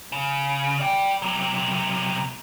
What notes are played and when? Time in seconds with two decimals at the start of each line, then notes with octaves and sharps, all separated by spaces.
0.12 C#3
0.80 D5 G5
1.22 C3 F#3